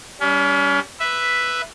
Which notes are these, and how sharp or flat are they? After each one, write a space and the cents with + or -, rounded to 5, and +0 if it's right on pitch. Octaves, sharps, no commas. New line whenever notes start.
G3 +0 C#4 +35
B4 +0 E5 +0